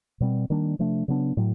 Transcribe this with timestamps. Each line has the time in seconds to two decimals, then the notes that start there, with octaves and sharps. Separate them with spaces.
0.20 B2 G3 C4
0.50 D#3 G3 A#3 D4
0.79 C3 F3 A3 D4
1.08 C#3 F#3 B3 D4
1.37 A2 F#3